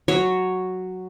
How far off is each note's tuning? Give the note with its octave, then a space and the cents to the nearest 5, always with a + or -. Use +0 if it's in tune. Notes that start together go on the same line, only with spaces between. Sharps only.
F#3 +0 C#5 +0